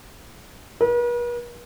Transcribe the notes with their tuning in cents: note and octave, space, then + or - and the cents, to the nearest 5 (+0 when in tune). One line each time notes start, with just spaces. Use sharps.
B4 -45